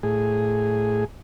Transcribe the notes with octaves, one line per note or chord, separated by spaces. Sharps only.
A2 G#4